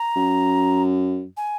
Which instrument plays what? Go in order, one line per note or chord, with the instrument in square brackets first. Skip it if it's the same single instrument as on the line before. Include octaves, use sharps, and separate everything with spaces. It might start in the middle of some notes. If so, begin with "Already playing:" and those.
Already playing: [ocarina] A#5
[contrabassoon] F#2
[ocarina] G#5